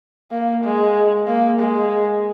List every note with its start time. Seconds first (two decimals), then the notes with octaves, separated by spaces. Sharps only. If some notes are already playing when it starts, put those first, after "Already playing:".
0.32 A#3
0.63 G#3
1.27 A#3
1.59 G#3